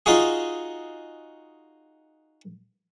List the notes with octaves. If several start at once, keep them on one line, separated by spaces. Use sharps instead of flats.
D#4 F4 F#4 G#4